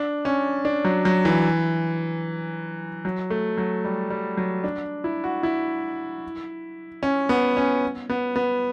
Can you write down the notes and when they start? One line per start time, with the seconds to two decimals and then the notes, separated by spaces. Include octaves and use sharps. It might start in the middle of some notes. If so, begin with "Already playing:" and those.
Already playing: D4
0.25 C#4
0.65 D4
0.85 F#3
1.05 F#3
1.25 E3
3.05 F#3
3.30 A3
3.58 F#3
3.85 G3
4.10 G3
4.37 F#3
4.64 D4
5.04 E4
5.24 F#4
5.43 E4
7.03 C#4
7.29 B3
7.57 C#4
8.09 B3
8.36 B3